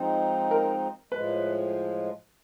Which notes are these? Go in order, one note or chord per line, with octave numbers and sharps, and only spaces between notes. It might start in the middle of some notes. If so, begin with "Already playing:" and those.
Already playing: F3 G#3 C4 D#4
A#4
A2 F3 G#3 B4